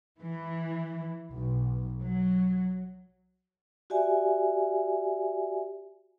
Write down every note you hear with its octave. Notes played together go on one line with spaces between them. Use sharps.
E3
B1
F#3
F#4 G4 D5 E5 G#5